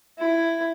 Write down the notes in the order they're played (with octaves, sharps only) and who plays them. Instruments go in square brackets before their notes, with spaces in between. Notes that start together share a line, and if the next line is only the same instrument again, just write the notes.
[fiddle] E4